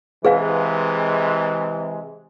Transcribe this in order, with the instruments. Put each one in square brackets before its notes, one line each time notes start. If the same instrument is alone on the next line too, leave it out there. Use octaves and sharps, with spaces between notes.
[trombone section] C3 E3 G#3 [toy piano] G#4 B4 F5